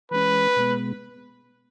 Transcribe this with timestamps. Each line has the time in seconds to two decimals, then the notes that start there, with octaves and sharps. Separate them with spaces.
0.11 E3 G#3 C#4 B4
0.56 B2 G#3 B3